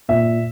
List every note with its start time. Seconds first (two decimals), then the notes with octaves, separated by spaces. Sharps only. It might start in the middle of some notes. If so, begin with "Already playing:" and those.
0.09 A#2 E5